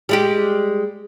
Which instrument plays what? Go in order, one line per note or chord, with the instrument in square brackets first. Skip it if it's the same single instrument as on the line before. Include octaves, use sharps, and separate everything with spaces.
[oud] G3 G#3 G4